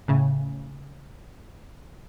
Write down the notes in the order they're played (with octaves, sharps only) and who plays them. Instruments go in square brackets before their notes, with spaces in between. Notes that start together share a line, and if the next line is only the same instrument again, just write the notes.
[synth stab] A2 C#3